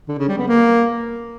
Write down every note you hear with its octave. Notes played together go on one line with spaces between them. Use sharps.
D3
C#3
G3
B3
A#3